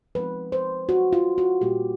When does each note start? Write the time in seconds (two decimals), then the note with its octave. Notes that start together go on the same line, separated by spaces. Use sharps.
0.15 F3 G#3 C4 D#4 B4
0.52 C5
0.89 F#4
1.13 F4
1.38 F#4
1.61 A#2 G3 A#3 G4